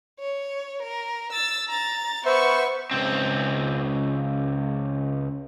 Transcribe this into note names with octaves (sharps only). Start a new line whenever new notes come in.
C#5
A#4
E6 A6
A#5 A6
B3 C5 E5 C#6
C#2 C4